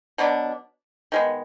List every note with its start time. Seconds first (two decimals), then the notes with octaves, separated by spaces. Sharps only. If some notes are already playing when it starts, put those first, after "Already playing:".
0.18 B2 F#3 B3 D4
1.12 D#3 G#3 B3